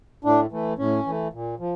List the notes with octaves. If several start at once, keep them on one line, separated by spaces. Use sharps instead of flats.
A2 D4
E3 A3
A2 C#4
E3 A3
A#2
F3